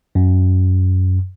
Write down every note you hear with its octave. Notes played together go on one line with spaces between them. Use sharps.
F#2